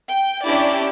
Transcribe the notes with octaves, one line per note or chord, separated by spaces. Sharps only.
G5
C#4 D4 E4 G4 D5